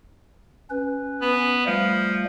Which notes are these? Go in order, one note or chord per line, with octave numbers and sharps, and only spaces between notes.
C#4 B4
B3
F3 G3 A3